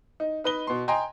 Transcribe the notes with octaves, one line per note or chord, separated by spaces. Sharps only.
D#4
D#4 B4 D#5 G7
B2 C6
D#5 G5 G#5 A#5 C6